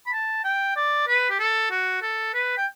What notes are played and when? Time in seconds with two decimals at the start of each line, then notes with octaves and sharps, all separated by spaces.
0.07 B5
0.13 A5
0.44 G5
0.76 D5
1.07 B4
1.30 G4
1.39 A4
1.71 F#4
2.02 A4
2.34 B4
2.57 G5